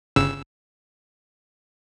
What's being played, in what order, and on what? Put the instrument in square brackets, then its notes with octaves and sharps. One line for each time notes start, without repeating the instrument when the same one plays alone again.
[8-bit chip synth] G1 C#3 E6